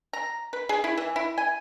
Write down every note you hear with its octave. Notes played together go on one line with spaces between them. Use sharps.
A#5
B4
G#4
E4
E3
E4
G#5